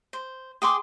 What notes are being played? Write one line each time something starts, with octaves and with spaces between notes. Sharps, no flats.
C5
G#4 G5 C6 D6